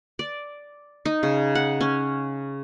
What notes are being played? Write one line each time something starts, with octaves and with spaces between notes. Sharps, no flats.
D5
D#4
C#3
F#5
C#4